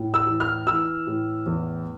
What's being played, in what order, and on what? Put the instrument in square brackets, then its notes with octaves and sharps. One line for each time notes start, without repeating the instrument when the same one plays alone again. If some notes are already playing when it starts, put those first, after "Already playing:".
Already playing: [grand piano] A2
E6
E3
F6
E3 E6
A2
E2